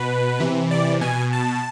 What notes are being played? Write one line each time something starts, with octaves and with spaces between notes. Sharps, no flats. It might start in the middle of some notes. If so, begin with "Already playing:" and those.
Already playing: B2 B4
C3 E3
D5
B2 G#5
A5